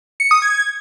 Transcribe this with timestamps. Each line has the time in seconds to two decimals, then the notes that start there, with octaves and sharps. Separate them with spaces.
0.20 C#7
0.31 D#6
0.42 G#6